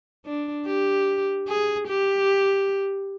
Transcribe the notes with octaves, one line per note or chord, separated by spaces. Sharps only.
D4
G4
G#4
G4